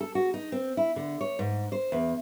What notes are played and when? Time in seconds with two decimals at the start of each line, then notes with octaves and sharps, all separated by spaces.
0.01 A4
0.15 F#4
0.34 D#4
0.52 C4
0.77 E4
0.96 D3
1.21 C#5
1.39 G#2
1.72 C5
1.92 E2